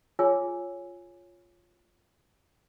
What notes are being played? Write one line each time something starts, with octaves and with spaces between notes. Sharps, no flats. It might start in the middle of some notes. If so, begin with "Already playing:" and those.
F4 G#4 C#5 G#5 E6